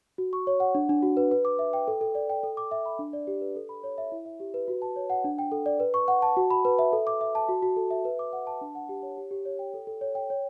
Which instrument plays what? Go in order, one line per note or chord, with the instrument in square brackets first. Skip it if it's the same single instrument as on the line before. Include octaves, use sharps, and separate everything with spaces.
[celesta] F#4
C#6
C#5
F#5
D4
D4
F#4
B4
B4
D6
E5
G5
A4
A4
D5
G5
A4
D6
E5
B5
D4
D5
G4
B4
A4
B5
C#5
E5
E4
E5
G4
B4
F#4
A5
C#5
F#5
D4
G5
A4
D5
B4
C#6
F#5
A5
F#4
B5
B4
E5
A4
D6
E5
A5
F#4
F#4
A4
E5
B4
D6
F#5
A5
D4
F#5
G4
C#5
G4
G4
C#5
G5
A4
A4
C#5
G5
C#5